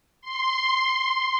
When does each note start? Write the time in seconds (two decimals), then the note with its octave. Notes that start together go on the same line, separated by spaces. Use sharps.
0.22 C6